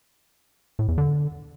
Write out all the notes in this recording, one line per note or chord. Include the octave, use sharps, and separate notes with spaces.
A2
E2
D3